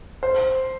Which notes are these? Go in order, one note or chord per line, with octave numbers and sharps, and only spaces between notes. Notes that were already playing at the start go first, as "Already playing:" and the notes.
C5